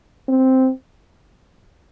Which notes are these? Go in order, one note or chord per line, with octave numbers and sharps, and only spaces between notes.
C4